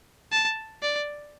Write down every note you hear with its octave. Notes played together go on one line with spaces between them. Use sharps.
A5
D5